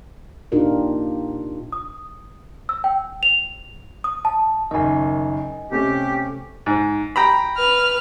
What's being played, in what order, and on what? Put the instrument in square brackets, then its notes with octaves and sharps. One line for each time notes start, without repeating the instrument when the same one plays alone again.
[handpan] A#2 D4 D#4 F4 G4 A#4
[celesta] D#6
E6
G5
F7
D#6
A5
[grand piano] F#1 D#3 [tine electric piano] D#5 G#5
[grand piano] C3 A3 C#4 [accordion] G4
[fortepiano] G#2
G5 A#5 B5
[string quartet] B4 F6